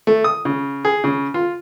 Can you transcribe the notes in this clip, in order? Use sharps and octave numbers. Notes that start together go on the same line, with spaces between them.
A3
D#6
C#3
G#4
C#3
F4